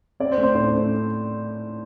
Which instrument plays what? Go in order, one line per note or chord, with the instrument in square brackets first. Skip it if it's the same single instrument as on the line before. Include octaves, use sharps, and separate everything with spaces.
[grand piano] C4 D5
C5
A3
C5
A2 C5
A3